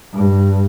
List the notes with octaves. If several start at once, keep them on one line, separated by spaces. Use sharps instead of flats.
G2